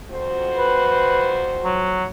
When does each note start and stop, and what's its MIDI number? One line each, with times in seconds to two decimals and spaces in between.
0.10 1.99 41
0.10 1.99 66
0.10 1.99 72
0.58 1.39 71
1.64 2.05 54